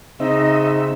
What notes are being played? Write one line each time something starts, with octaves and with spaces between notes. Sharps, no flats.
C#3 C4 D#4 D#5 E5